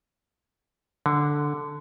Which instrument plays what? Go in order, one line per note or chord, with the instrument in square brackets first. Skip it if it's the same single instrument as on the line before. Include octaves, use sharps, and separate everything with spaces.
[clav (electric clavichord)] D3